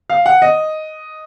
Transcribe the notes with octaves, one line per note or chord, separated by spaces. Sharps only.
F5
F#5
D#5